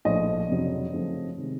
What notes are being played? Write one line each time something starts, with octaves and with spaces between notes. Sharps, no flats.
A#1 A2 F3 D#5
F1 F2 C#3 F#3
F#2 C#3 F3 A3 C4
C3 D#3 G#3